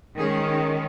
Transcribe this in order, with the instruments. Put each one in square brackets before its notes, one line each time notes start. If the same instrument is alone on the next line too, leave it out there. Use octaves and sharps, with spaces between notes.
[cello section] D#3 G#3 C#4 G#4